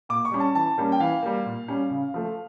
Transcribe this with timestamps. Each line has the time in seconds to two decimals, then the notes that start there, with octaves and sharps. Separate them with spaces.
0.09 A#2 D6
0.25 C#6
0.32 G3 C#4
0.40 A5
0.55 E3 A5
0.78 G3 A#3 C#4
0.92 G5
1.00 E3 F5
1.23 G3 A#3
1.46 A#2
1.68 G3 C#4
1.91 C#3
2.14 F3 A3